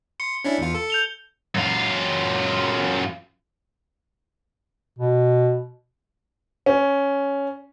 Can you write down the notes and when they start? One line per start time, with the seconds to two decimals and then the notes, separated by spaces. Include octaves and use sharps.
0.20 C6 C#7
0.44 C#4 D4 E4
0.58 E2 F4
0.75 A4
0.90 G6 F7 G7
1.55 F#2 F4
4.99 B2
6.66 C#4